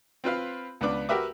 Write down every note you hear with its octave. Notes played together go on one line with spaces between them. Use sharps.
C4 F4 B4 F5
C#2 B3 D4 B4 D6
F#4 G4 A#4 B4 E5 D6